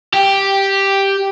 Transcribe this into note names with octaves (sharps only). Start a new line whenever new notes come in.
G4